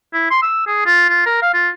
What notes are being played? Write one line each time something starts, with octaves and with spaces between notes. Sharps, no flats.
E4
C6
E6
G#4
F4
F4
A#4
F5
F4